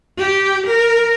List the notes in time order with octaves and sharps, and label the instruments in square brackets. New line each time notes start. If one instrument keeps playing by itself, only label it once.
[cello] G4
A#4